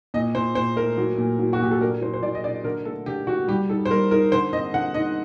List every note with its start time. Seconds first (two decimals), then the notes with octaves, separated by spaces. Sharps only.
0.14 A#2 D#5
0.35 A#2 C5
0.55 A#2 C5
0.76 A3 A#4
0.97 F#3
1.18 A#2
1.39 F#3
1.53 F#4
1.60 A#2 G4
1.71 A4
1.80 D4 A#4
2.01 F#3 C5
2.13 C5
2.22 F#3 D5
2.35 D#5
2.44 D4 D5
2.64 D3 A#4
2.85 A3 A4
3.06 D3 G4
3.27 D3 F#4
3.48 G3 G4
3.69 D#4 A4
3.85 C5
3.90 G3 A#4
4.11 D#4 A#4
4.32 D3 C5
4.53 C4 D#5
4.74 D3 F#5
4.94 D#4 D#5